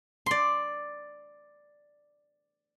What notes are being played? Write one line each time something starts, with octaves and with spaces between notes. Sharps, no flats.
D5 C6